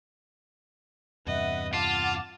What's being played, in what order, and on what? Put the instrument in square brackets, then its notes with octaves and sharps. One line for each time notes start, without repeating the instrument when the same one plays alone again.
[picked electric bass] E2 G2 C3 [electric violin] B4 D#5 [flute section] E5 F#5
[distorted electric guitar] F4 [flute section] F#5 D6 [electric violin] A5 F6